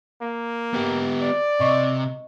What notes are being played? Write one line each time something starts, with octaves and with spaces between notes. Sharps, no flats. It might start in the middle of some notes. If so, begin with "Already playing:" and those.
A#3
B3 G4
D5
C3 D#5 C#6